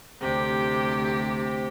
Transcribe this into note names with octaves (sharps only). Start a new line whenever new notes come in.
D2 C3 G4